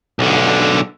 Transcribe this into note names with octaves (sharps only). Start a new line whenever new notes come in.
B1 D3